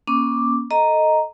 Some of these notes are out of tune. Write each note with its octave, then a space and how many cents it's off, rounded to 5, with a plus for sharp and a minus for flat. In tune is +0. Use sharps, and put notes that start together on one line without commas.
A#3 +30 C#4 +0 D6 +0
A4 +0 D#5 +0 A#5 +0